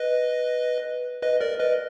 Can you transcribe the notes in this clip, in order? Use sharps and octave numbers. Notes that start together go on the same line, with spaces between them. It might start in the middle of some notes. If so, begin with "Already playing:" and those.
Already playing: B4 D#5
B4 D#5
A#4 D5
B4 D#5